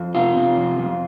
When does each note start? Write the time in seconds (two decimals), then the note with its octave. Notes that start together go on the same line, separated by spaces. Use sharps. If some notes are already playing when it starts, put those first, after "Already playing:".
Already playing: F2
0.15 C3 F4
0.37 C3
0.57 F2
0.79 F2